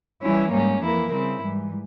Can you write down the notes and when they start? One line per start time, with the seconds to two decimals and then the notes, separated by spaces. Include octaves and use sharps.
0.21 E3 G3 C#4 E4
0.50 G#2 G3 A#3 C#4
0.81 F2 E3 A#3 E4 A#4
1.11 C#3 G3 C4 E4
1.41 G#2 E3 G3